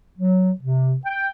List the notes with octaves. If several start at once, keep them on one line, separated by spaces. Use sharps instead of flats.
F#3
C3
G5